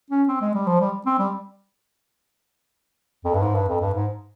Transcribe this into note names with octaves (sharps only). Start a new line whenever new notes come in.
C#4
C4
G#3
G3
F3
G3
C4
G3
F2
G2
G#2
G2
F2
G2
G#2